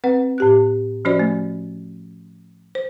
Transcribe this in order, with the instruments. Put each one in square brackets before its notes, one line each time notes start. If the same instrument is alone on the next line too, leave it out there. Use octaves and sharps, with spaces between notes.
[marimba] C4 B4 F#5
A2 G4 F#6
F3 C#4 F#4 C5 D5
A3
C5